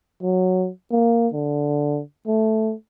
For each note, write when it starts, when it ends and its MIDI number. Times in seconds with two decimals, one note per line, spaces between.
0.23 0.70 54
0.91 1.28 58
1.33 2.01 50
2.27 2.74 57